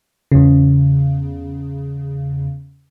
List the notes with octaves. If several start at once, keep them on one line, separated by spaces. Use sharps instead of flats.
E2 C#3